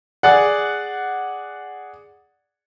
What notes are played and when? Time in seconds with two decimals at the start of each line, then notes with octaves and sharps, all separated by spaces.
0.23 G#4 D5 F#5